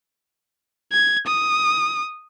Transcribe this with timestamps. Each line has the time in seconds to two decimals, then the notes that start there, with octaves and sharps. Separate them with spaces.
0.92 G#6
1.27 D#6